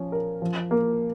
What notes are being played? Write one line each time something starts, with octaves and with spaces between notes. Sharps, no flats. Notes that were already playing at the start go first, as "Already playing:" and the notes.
Already playing: F3 C#4
A#4
F3
A#3